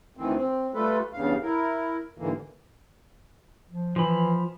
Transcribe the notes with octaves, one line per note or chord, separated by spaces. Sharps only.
D2 D#3 E3 C4
C4
G3 A3 F4 A4 B4
E2 G2 C#3 F5
E4 A#4
D#2 G#2 D3 E3 A#3
F3
E3 F3 B5